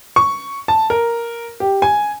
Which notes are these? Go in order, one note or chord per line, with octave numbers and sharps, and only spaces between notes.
C#6
A5
A#4
G4
G#5